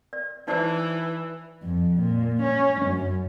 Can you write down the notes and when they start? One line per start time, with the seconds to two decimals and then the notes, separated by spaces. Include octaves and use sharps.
0.13 D5
0.48 E3 D#4 C5 D5
1.63 F2
2.01 A#2
2.42 C#4
2.85 F#2